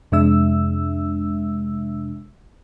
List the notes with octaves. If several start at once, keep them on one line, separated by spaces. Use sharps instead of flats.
F2 C3 G#3 D4 E5 E6